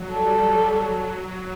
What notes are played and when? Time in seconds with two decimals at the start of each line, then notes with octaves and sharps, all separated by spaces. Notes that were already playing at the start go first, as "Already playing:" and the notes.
Already playing: F#3
0.10 G3 A4
0.61 F#3